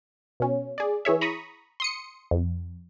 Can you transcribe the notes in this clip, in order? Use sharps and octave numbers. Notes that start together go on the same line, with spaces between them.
B2 C#4
G#4 D5
E3 G#4 C#5 E5
A#5 B5 C#6 D#6
C6 D#6 C#7
F2